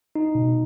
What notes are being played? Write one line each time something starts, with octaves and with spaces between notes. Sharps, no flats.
D#4
B2